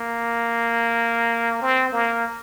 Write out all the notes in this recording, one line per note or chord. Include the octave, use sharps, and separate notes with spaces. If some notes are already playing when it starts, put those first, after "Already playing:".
Already playing: A#3
C4
A#3